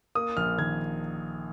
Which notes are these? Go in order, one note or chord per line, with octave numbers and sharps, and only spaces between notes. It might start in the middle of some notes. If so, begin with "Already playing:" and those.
A#3 D#6
A#1 F6
D#3 G#6